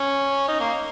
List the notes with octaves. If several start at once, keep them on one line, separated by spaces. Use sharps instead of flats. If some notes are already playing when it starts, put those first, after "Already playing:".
Already playing: C#4
D#4
A#3